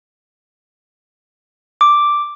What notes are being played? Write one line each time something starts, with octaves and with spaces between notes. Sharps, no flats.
D6